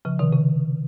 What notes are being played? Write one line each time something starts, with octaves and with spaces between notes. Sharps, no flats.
C#3 F3
C3 D#3
C#3